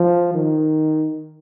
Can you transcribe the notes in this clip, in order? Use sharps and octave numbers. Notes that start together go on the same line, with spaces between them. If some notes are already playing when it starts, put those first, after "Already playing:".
Already playing: F3
D#3